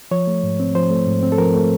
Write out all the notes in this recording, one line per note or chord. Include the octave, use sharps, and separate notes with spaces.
F3 C#5
A3
G#2
C4
F3 C5
A3
G#2
C4
A4
F3 A#4
A3